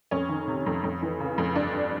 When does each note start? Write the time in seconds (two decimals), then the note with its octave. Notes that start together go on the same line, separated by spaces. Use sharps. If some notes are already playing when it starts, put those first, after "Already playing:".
0.11 F2 C#4
0.29 D#3
0.48 C3
0.66 F2
0.84 F2
1.02 E3
1.20 C#3
1.38 F2
1.56 G2 D4
1.73 G2